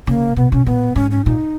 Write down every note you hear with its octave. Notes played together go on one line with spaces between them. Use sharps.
C#3 A#3
B2 B3
B2 C#4
A#2 B3
G#2 C#4
C#4
A#2 D#4